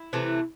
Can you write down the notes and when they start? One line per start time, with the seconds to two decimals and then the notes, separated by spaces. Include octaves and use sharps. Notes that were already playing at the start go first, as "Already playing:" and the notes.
Already playing: E4
0.13 C3 E3 A3